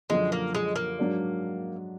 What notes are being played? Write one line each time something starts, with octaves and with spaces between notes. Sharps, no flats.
F#2 D3 F3 G#3
A#3
G#3
A#3
G#2 F#3 D4 F#4 D5